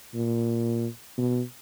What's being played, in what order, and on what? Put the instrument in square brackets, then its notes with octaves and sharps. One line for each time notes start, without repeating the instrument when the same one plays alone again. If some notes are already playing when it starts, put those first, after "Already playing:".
[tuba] A#2
B2